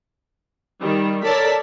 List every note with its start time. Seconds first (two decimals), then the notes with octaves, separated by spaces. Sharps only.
0.80 D#3 G3
1.24 A4 A#4 C#5 D5 A5 B6